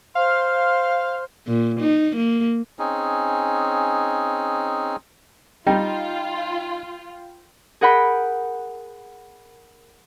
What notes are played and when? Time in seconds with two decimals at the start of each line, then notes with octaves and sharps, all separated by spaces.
0.15 C5 F5 C6 F6
1.47 A#2
1.80 D#4
2.16 A#3
2.79 C4 C#4 D#4 G#4
5.67 G3 D#4 F4 G5
7.81 G#4 A#4 F#5 G5 B5